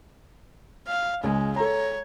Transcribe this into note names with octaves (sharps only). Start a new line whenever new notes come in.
F5
C#2 G#3
A4 C#5 A#5